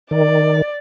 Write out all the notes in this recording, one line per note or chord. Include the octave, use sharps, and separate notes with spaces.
D#3 D5